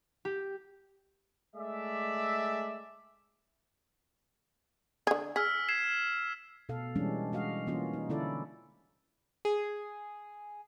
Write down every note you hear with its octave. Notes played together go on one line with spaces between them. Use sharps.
G4
G#3 A3 D5 E5
D3 G#4
G#4 E6 F6 B6
G#6 C7 E7
B2 A4 F5
E3 G3 G#3 C#4 D4
G#3 F#4 D#5 F5
E3 A#3 C#4 F4 F#4
D#4
D3 C#4 E4 A4 D5
G#4